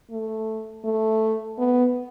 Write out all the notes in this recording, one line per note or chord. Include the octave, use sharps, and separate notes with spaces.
A3
A3
B3